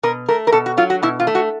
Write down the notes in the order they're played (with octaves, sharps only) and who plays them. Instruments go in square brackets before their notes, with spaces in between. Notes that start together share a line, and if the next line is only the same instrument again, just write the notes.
[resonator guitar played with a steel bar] B2 A#4
A3 A#4
A#4
B2 A4
F#4
F#3 F4
F#4
B2 E4
F4
A3
F#4